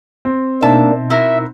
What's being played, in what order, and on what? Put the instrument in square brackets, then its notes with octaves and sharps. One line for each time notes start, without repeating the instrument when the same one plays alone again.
[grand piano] C4
[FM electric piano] B2 D#4 [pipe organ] A#3 D4 [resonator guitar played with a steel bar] E5 A5
[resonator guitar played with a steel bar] E4 F#4 A#4 [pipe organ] E5